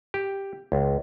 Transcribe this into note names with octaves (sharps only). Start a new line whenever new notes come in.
G4
C#2